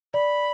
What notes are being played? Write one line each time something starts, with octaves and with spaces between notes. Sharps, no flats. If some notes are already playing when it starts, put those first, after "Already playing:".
D5 B5